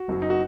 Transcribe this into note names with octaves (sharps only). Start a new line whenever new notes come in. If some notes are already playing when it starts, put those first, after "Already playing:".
Already playing: F#4
F#1 F#2 F#3
D#4
F#4